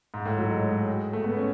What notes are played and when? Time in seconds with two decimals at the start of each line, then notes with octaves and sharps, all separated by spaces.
0.14 G#2
0.26 A2
0.37 F#3
0.51 G#3
1.13 A3
1.24 B3
1.37 C#4